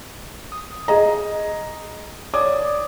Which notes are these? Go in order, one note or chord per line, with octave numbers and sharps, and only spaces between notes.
D#6
G#4 D#5 A#5
C#5 D5 D6 D#6